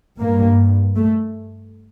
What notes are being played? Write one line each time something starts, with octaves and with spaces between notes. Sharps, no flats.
G2 A#3
A3